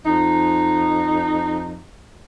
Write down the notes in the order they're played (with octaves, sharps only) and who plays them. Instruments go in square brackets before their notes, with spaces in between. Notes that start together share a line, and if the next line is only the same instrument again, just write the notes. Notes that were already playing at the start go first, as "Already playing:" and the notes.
[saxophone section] F2 D#4